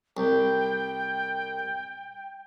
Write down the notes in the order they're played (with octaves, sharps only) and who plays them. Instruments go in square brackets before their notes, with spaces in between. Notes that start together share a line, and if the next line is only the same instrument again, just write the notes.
[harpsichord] C2 [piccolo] G5